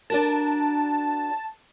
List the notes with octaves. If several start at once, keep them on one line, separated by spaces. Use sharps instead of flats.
D4 F#4 A#4 A5